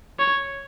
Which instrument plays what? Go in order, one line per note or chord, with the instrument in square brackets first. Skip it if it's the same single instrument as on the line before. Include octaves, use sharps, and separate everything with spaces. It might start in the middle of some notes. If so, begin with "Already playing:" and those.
[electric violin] C#5